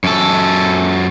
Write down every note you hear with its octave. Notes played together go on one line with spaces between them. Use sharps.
F#2 A4